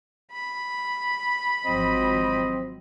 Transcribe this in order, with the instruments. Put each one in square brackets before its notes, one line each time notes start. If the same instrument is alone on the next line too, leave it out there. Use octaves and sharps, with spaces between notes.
[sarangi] B5
[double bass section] G#1 F3 F#3 [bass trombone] C4 [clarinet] D#5